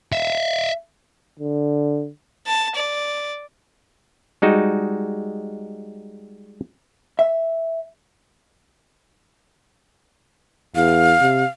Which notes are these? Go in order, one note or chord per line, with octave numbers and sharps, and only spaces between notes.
E5 F5
D3
A5
D5
G3 G#3 D#4 F#4
E5
E2 F5
C3